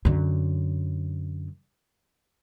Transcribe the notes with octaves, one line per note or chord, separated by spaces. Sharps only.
F#2 D3